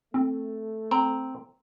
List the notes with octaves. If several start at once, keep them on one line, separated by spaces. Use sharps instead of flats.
A3 C4
C4 A#5